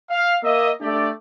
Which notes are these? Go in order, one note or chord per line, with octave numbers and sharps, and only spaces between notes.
F5
A#3 D#5 E5
A3 D4 G4 D5